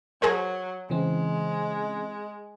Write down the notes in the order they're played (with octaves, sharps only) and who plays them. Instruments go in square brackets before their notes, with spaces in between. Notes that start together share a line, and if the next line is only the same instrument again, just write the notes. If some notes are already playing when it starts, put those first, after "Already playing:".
[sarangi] F#3 [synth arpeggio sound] G#4 A#4 C5
[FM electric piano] C#3 E3 C4 [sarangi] G#3